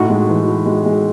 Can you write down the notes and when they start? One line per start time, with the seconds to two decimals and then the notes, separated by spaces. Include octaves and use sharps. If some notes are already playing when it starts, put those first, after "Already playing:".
Already playing: A2 D#4 F#4
0.10 G#3
0.28 E3
0.48 E3
0.66 G#3
0.86 G#3